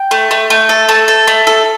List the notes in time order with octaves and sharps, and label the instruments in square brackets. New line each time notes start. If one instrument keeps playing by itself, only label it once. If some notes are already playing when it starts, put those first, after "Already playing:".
Already playing: [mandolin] G5
A3
A3
A3
A4
A3 A5
A4
A3
A4